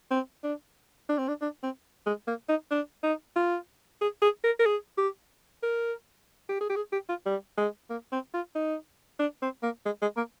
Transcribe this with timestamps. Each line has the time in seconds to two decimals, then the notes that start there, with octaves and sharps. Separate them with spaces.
0.11 C4
0.44 D4
1.09 D4
1.18 C4
1.28 D4
1.42 D4
1.63 C4
2.06 G#3
2.28 A#3
2.49 D#4
2.71 D4
3.03 D#4
3.36 F4
4.01 G#4
4.22 G#4
4.44 A#4
4.59 A#4
4.66 G#4
4.98 G4
5.63 A#4
6.49 G4
6.61 G#4
6.70 G4
6.76 G#4
6.93 G4
7.09 F4
7.26 G3
7.58 G#3
7.90 A#3
8.12 C4
8.34 F4
8.55 D#4
9.20 D4
9.42 C4
9.63 A#3
9.86 G#3
10.02 G#3
10.17 A#3